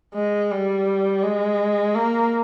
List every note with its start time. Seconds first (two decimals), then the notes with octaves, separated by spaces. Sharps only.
0.14 G#3
0.51 G3
1.23 G#3
1.95 A#3